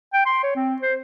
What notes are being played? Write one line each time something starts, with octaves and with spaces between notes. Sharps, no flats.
G5
C6
C#5
C4
C5